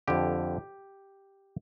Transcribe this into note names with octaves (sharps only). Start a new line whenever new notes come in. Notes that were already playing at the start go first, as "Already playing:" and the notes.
F2 D3 G4